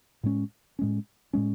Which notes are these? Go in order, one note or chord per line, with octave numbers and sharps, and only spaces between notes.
A2 G#3 C#4
A2 G#3 C#4
A2 G#3 C#4